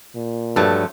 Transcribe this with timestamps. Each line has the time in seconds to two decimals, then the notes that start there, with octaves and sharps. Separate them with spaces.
0.15 A#2
0.56 G2 F3 F#3 A3